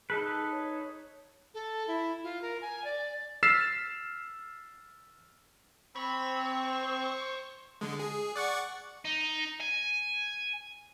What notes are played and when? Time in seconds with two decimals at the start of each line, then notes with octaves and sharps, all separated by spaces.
0.10 D#4 G#4 A4 B4
0.51 C#5
1.54 A4
1.87 E4
2.23 F4
2.41 A#4
2.61 G#5
2.84 D5
3.43 E6 F6 A6 B6 C7 E7
5.96 C4 C#5 B5
6.66 C5
7.81 D3 G#3
7.99 G#4
8.36 D5 F#5 C#6
9.05 D#4
9.60 G#5